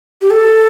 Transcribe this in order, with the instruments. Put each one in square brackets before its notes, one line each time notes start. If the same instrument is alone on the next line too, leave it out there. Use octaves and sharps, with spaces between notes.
[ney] G4
A4